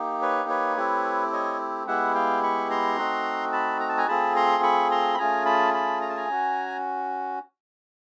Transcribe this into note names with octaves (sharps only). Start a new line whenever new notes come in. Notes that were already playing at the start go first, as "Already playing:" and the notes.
Already playing: A#3 D#4 G4
B4 C#5
B4 C#5
A3 C4 E4 G4
C#5 D#5
G#3 B3 E4 G4 E5 F#5
F5 G5
B5 C#6
A#5 C6
A3 C4 D#4 F#4
A5 B5
A#5
A5
G#5 A#5
A3 C4 F4 G#4 A5 B5
A#5 C6
B5 C#6
A#5 C6
B5
A3 C#4 F4 G#4 G#5 A#5
A5 B5
A5 B5
A#5
A5
G#5 A#5
C#4 F#4